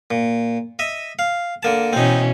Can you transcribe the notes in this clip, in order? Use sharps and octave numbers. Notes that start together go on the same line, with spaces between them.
A#2
D#5 E5
F5
D3 A#3 A5
B2 E3 C4 C#4 D#4